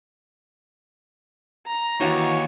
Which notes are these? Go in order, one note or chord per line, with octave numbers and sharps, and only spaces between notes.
A#5
D#2 E3 F#4 C#5 F#5